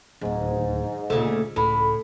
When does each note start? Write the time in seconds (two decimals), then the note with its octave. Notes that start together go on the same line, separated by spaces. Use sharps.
0.21 D1 D#2 G#2
1.10 D2 A#2 C#3 A3
1.56 C#2 A2 B5